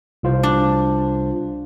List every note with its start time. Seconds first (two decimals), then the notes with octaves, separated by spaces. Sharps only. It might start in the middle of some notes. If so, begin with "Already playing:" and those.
0.23 C2 F4 C5
0.43 D4